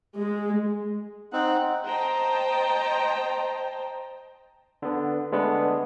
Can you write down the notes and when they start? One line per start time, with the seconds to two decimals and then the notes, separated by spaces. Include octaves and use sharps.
0.16 G#3
1.33 C4 D#4 F#5
1.84 C5 D#5 G5 A5 A#5
4.82 D3 B3
5.32 D3 G#3 A3 B3 D4